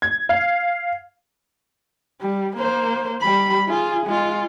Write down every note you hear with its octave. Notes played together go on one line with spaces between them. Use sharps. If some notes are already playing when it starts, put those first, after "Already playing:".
G#6
F5
G3
A#3 C5
G3 B5
F4 G#4
G#3 F4